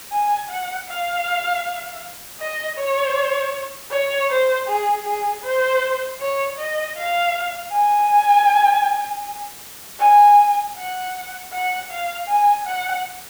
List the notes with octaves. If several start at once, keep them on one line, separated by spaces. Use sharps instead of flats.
G#5
F#5
F5
D#5
C#5
C#5
C5
G#4
G#4
C5
C#5
D#5
F5
G#5
G#5
F#5
F#5
F5
G#5
F#5